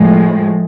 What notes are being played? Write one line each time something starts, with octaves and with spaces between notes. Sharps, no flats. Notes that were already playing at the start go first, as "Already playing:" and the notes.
Already playing: A2 F3 G#3